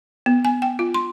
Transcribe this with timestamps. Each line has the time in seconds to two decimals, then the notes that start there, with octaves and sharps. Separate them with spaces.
0.26 B3
0.45 G#5
0.62 G5
0.79 F4
0.94 C6